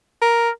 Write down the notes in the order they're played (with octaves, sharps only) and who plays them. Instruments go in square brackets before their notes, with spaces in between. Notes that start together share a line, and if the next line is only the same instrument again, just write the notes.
[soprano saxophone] A#4